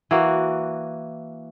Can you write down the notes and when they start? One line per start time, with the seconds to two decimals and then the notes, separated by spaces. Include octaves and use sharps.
0.11 E3 A#3 F#4